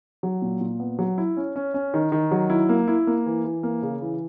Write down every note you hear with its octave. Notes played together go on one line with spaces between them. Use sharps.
F#3
A#2
A#2
B3
F#3
E4
C#4
C#4
C#4
D#3
D#3
F#3
E4
A#3
E4
A#3
E3
E3
A#3
C#3
E3